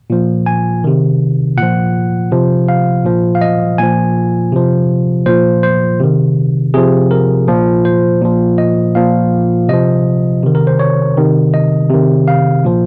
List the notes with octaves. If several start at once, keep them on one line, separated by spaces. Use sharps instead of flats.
A#2 F3
G#5
C3 D#3
A#2 F3 F#5
C3 F3
F5
A#2 F3
F5
D#5
A#2 F3 G#5
C3 F3
A#2 F3 C5
C5
C3 D#3
C3 F3 G#4
A#4
A#2 F3
C5
A#2 F3
D#5
A#2 F3 F5
C3 F3 D#5
C3 D#3
A#4
C5
C#5
C3 D#3
D#5
C3 D#3
F5
A#2 F3